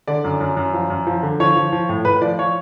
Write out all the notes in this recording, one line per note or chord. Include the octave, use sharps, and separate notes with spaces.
D3 D5
F#2
F#2
F#2
F3
F#2
F3
D3
F3 C#5
F3
F3
A2
A2 B4
F3 D5
F3 C#5